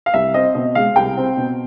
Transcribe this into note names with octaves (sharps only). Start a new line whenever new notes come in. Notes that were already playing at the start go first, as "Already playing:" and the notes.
F5
C2 E5
C4 D#5
B2 D#5
G#3 F5
C2 G5
C4
B2